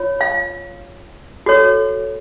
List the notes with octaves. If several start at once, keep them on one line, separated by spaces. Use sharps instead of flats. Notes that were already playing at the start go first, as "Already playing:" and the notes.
Already playing: F4 C#5
F5
F#4 A4 C#5